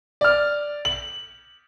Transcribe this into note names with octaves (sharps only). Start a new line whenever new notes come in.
D5 F6
F#7